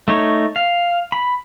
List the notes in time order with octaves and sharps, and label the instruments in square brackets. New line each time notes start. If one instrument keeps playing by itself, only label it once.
[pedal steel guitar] A3 D#4 C#5
F5
B5